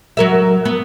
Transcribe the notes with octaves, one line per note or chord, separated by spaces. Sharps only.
F#3 A#4 E5
B3